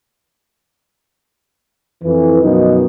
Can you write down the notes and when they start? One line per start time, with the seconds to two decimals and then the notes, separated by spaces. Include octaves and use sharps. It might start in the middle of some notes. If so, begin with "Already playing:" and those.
2.03 F2 E3
2.43 F#2 B2 D#3 F3 D#4